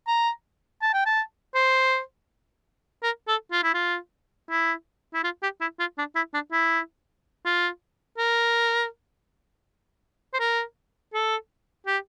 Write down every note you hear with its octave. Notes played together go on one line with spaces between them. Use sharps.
A#5
A5
G5
A5
C5
A#4
A4
F4
E4
F4
E4
E4
F4
G4
E4
F4
D4
E4
D4
E4
F4
A#4
C5
A#4
A4
G4